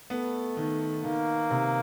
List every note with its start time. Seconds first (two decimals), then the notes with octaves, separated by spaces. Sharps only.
0.10 A3 B3
0.57 D#3
1.04 D#3 A#3
1.51 C3